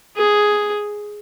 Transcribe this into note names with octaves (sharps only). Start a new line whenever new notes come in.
G#4